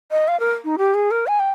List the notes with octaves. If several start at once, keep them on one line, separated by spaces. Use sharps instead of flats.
D#5
F5
A#4
D#4
G4
G#4
A#4
G#5
G5